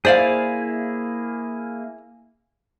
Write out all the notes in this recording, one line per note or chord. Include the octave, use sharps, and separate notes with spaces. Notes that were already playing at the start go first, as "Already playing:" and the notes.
A#3 E4 G#4 C5 D5 F5